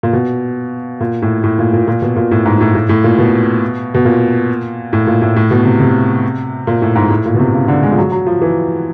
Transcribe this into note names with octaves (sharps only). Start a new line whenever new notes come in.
A#2
B2
A#2
A2
A2
A#2
A#2
A#2
B2
A#2
A2
G#2
A2
A2
A2
A#2
B2
B2
A#2
A2
A#2
A2
A2
B2
C3
C3
A#2
A2
G#2
A2
A#2
B2
C3
C#3
D3
G#3
F3
F#3
F#3
F3
E3